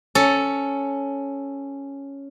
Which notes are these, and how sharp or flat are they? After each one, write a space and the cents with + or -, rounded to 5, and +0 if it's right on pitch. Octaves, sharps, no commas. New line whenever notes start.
C#4 +0 A4 +0